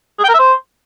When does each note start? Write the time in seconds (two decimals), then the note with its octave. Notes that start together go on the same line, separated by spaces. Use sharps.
0.19 G#4
0.24 G5
0.29 A#4
0.34 E5
0.39 C5